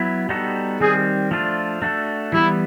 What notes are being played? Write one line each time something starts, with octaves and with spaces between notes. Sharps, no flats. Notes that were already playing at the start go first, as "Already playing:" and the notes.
Already playing: F#3 B3 E4
G3 B3 D#4 F#4 A4
D#3 G3 C4 G#4
F3 A3 D4 F4
A3 D4 F#4 A4
E3 G3 B3 E4